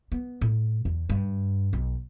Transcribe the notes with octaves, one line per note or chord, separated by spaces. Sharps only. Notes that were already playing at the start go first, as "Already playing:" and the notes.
B3
A2
E2
G2
B1